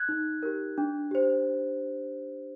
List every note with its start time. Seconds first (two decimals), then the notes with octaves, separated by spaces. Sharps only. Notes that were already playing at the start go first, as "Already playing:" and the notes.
Already playing: F#6 G#6
0.09 D#4
0.43 G4 A#4
0.78 D4
1.11 G4 C5